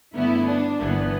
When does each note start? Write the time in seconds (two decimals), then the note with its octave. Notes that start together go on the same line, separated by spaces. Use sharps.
0.14 G2 D3 A3 B3 E4
0.47 D4
0.80 G1 G2 E3 B3